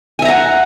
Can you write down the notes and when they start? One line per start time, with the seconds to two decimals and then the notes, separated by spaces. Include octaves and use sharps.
0.19 G#5
0.22 E5
0.25 A#5
0.28 F#5